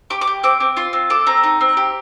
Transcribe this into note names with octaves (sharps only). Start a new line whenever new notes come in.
G4 D6
D6
G4
C4 D6
C4
F4 C6
C4
A4 D6
C4 A#5
D#4
C4
G4